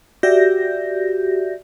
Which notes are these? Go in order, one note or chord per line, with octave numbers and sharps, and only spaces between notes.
F#4 G4 D5 E5 G6 A#6